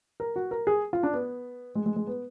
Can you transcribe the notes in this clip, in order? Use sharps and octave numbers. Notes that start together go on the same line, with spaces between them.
A#4
F#4
A#4
G#4
F4
D4
B3
G#3
G#3
G#3
B3